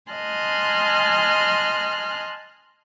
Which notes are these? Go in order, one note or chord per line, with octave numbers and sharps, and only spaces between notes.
D#5 G#5 A5 C6 F6 F#6